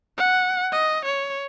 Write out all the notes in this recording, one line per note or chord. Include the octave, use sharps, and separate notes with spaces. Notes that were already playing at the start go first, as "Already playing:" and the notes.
F#5
D#5
C#5